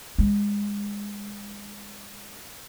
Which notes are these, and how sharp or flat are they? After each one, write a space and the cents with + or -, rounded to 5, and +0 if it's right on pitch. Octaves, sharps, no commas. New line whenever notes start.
G#3 -25